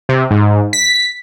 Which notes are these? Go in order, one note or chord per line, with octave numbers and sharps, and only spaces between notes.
C3
G#2
B6